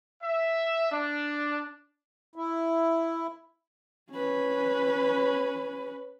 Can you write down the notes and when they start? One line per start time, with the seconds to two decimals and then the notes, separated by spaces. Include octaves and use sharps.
0.23 E5
0.92 D4
2.36 E4
4.11 C#4 B4